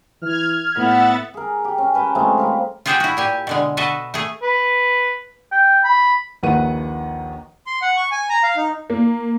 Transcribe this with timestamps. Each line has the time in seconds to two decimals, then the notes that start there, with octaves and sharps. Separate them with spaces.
0.22 E3 F6 G#6
0.76 A2 B3 E5 F#5 A6
1.34 G#4 A#4
1.64 G4
1.78 C#4
1.94 A#4 B4 G5 A5
2.15 C3 F3 G#3 A3
2.37 G4 A#4 B4
2.86 F4 G4 G#4 C5 F#5 G5
3.00 E4 F#4
3.17 A#2 G4 G#5
3.47 B2 D3 G#3
3.77 F#4 A4 B4 D#5 E5
4.14 A3 G#4
4.42 B4
5.52 G5
5.84 B5
6.43 A#1 D#2 D#3 B4 F#5 D#7
7.67 C6
7.82 F#5
7.97 C#6
8.11 G#5
8.29 A#5
8.43 F5
8.56 D#4
8.90 A#3